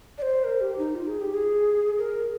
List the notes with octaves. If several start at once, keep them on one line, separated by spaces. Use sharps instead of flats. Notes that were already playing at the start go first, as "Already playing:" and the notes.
D5
C5
A#4
G4
D#4
F4
G#4
G4
G#4
A#4